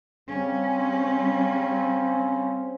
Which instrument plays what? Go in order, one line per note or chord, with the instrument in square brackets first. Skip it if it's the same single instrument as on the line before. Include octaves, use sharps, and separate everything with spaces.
[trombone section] C#3 C4 [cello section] G3 C#4